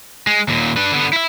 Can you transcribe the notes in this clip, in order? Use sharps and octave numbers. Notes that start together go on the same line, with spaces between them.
G#3
D#2 A#2
D4 B4
D3 B3
E4 E5